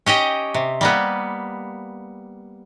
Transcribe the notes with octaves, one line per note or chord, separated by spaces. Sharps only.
C#4 G4 D#5 G5
C3
G3 A#3 B3